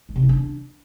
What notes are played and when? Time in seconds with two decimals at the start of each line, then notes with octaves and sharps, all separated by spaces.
0.09 G#3
0.16 C3
0.22 E4
0.29 D4